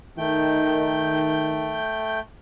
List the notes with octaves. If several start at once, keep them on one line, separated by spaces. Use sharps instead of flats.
D#3 A3 G5 G6